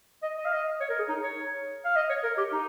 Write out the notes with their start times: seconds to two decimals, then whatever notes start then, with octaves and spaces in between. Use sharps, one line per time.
0.23 D#5
0.37 D#5
0.45 F5
0.52 D#5
0.81 C#5
0.89 A#4
0.99 G#4
1.09 D#4
1.23 C#5
1.85 F5
1.96 D#5
2.10 C#5
2.23 A#4
2.37 G4
2.52 D#4